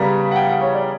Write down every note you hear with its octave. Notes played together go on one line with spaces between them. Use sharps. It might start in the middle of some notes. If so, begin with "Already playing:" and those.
Already playing: C#3 G3 B3 A#5
F#5
G5
F#5
C#5
D5